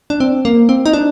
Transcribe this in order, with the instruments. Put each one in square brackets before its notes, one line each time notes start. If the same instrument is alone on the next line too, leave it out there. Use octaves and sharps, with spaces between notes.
[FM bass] D4
C4
A#3
C4
D#4
D4